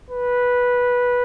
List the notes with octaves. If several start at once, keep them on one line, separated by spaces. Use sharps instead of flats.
B4